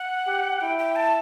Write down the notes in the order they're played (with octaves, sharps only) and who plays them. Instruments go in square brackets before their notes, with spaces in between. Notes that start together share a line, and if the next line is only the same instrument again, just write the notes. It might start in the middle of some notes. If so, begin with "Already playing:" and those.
Already playing: [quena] F#5
[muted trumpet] G4
[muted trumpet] E4 [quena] G5
[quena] G5
A5